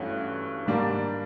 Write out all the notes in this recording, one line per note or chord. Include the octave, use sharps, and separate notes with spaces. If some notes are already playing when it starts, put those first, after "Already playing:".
Already playing: G2 E3 A3 C#4 F#4
G#2 D#3 G3 A#3 D4